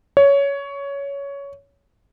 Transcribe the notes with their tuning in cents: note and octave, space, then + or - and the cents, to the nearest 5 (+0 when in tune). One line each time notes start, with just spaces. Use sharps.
C#5 +15